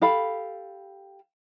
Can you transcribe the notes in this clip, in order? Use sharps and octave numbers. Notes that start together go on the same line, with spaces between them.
G4 A4 F5 B5